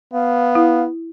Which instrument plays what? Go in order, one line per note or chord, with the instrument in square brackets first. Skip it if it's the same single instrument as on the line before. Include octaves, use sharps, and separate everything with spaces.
[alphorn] B3 [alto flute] F5
[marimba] E4